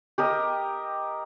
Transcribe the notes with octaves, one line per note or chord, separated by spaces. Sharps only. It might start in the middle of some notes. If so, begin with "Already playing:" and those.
G4 A#4 D#5